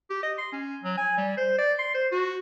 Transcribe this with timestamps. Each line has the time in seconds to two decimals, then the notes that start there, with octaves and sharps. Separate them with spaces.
0.10 G4
0.22 D#5
0.38 C6
0.52 C#4
0.83 F#3
0.97 G#5
1.17 G3
1.37 C5
1.58 D5
1.78 C6
1.94 C5
2.12 F#4